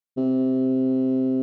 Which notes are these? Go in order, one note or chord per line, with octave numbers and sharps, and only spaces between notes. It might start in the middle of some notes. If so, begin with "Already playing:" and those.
C3